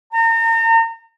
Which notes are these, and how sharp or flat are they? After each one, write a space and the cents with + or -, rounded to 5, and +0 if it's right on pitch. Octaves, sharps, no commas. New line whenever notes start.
A#5 -35